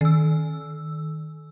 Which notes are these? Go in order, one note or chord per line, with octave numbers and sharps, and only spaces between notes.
D#3 E6